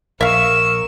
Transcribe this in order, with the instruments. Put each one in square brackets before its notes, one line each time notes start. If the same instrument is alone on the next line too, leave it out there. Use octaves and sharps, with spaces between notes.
[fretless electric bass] A#1 [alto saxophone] A#4 [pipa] E5 F5 [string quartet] C#6 E6